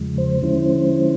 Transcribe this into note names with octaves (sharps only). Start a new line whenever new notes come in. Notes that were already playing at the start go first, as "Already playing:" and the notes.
Already playing: E2 C#3 F3 G#3
C5
D3 F3 G#3 C#4 E4